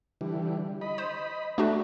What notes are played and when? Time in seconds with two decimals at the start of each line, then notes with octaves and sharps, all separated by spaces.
0.21 D3 E3 G3
0.81 D#5 B5
0.98 C5
1.58 A3 D4 F#4